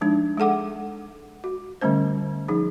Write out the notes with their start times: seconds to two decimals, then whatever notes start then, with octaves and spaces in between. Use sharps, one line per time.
0.01 F3 G#3 D4 D#4
0.38 G#3 G#4 A4 F#5 D6
1.44 F#4
1.81 D3 G3 A3 C#4 C5
2.48 F3 D#4 G#4